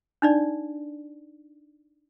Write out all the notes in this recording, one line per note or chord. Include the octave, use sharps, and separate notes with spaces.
D4 D#4 D5